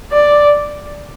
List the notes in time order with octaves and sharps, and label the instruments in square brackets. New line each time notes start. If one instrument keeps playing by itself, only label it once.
[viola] D5